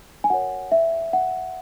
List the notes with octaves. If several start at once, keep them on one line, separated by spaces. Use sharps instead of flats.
G#5
F#4 A#4 C#5 F#5
E5
F#5